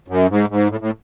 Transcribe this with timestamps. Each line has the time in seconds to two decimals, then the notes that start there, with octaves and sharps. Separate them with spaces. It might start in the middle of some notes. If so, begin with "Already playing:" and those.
0.08 F#2
0.30 G#2
0.49 G#2
0.70 A2
0.80 A2